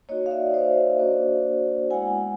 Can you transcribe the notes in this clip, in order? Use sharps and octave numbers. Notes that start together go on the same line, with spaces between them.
A#3 D#4 F#4 C#5 D#5
F5
D5 E5
C5 D5
A#3 D4 F#4 C5 D5
G#3 B3 E4 F#5 G#5